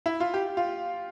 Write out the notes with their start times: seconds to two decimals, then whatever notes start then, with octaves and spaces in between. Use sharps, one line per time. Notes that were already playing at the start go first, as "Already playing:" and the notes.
0.06 E4
0.20 F4
0.34 G4
0.57 F4